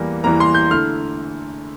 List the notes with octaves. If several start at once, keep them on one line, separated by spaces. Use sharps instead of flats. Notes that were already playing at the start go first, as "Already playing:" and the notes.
Already playing: E2 E3 G3 A#3
E2 E3 G3 A#3 A#5
C6
G6
D3 A3 E4 F6